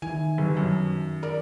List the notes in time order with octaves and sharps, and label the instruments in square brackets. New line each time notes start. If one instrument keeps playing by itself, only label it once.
[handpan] D#3 E4 [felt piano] G#5
[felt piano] G1
F#2
A#4 D5